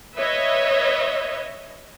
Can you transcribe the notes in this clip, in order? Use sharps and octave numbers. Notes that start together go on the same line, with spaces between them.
B4 C#5 D#5 E5